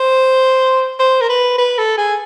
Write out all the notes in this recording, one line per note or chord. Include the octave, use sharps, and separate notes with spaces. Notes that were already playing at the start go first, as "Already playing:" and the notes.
Already playing: C5
C5
A#4
B4
B4
A4
G#4